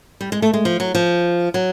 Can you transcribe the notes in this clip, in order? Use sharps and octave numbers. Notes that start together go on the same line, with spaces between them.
G3
G#3
A3
G#3
F3
F#3
F3
F#3